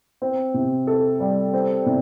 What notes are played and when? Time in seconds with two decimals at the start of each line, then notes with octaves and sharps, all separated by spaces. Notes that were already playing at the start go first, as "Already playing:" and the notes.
0.22 C4
0.54 C3
0.87 A4
1.20 G3
1.53 C4
1.86 C3